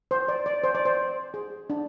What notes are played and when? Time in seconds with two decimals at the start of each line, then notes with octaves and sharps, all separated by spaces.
0.11 C5
0.28 D5
0.46 D5
0.64 C5
0.75 D5
0.85 C5
1.34 G#4
1.70 D4